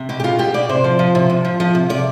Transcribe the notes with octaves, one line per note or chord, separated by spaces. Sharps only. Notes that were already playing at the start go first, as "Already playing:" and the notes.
Already playing: C3
B2 G4
G4
B2 F4
B2 G4
B2 D5
C3 C5
F3
F3
C3
C3
F3
F3
C3
C3 D5